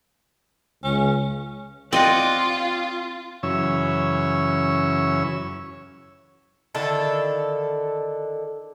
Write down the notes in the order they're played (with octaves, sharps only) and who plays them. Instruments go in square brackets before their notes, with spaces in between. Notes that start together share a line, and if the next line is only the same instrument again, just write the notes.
[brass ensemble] C#2 [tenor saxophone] C#4
[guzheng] C4 [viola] F4 [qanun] D5 D#5 F#5
[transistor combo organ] F#2 C#3 E3 C#4 C#5 E6
[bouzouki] D3 D#3 E4 A4